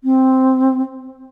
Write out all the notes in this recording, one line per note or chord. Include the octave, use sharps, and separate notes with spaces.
C4